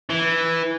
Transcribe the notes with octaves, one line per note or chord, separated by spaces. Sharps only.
E3